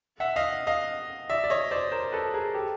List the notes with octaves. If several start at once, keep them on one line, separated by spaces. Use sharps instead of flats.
E5 F#5
D#5 F5
D#5 F5
D5 E5
D5
C#5 D#5
C5 D5
A#4 C5
A4 B4
G#4 A#4
G4 A4